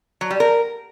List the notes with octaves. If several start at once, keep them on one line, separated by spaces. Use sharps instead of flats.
F#3
G3
A#4